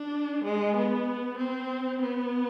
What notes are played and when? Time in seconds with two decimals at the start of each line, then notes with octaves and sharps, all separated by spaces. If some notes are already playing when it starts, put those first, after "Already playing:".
Already playing: D4
0.45 G#3
0.76 B3
1.38 C4
2.01 B3